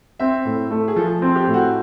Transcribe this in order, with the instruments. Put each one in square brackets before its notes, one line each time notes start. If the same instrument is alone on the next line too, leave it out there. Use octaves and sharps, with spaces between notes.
[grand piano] C4 [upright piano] E5
[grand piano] A2
A3
[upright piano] G#4
[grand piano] F3 [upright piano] A4
[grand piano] C4
[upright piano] G4
[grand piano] A2
[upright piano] F#4